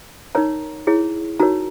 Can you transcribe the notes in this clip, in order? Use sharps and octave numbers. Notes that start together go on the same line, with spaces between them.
D#4 A#4 C#5 A#5
E4 G#4 C#5
D#4 F#4 A#4 C#5 A#5